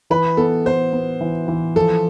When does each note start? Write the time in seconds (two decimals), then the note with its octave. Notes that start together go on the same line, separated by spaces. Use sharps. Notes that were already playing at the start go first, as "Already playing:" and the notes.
0.10 E3 B4
0.37 B3 A4
0.66 B3 C5
0.93 B3
1.21 E3
1.48 E3
1.76 F3 A4